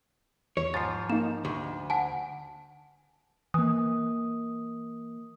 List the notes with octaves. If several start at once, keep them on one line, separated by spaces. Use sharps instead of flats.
E2 C#5
G#2 F3 A6 C7
A#3 D#4 E7
D2
F#5 G#5 A5
E3 A#3 D#6